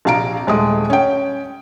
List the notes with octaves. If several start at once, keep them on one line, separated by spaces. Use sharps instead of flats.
A#1 C3 F5 A#5 D7
D#1 G#3 A3 D#6
C#4 G5